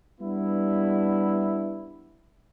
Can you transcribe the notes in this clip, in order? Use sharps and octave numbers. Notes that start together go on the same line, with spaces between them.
G3 B3 D4 E4